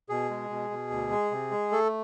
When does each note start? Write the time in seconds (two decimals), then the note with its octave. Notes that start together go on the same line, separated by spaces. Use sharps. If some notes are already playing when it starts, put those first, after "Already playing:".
0.09 B2 G#4
0.30 G#3
0.50 B2
0.70 B2
0.91 D2
1.11 G#3
1.31 C3
1.51 G#3
1.72 A3 A4